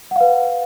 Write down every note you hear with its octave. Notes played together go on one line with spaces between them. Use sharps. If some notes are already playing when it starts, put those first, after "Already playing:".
B4 F5 F#5